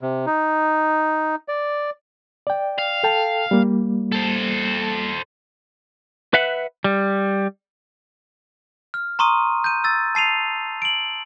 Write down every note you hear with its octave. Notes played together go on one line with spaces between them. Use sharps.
C3
D#4
D5
D5 G5
F5
A4 G5 A5
G3 A#3
A4 C5
B4 E5 F#5
G3
F6
A#5 C6 C#6 D#6 D#7
G6 D#7
E6 A6
A5 C7 D#7 F7
D7 F#7